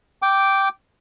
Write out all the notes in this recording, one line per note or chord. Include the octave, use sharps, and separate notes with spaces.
G5 D6